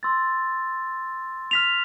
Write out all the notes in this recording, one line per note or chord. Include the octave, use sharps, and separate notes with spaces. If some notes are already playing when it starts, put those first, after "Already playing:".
C6 E6 A6
F6 B6 F7